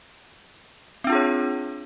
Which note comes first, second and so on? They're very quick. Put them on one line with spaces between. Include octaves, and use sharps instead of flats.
C4 D4 F4 G#4 C#5